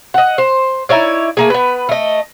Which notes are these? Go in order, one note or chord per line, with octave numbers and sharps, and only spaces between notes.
D#5 F#5
C5
D#4 E4 C#5 D5
A3 A#3 G#4
B3 B4
A3 D#5